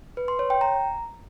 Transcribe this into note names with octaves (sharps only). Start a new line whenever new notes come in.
B4
C6
C#5
G5
A#5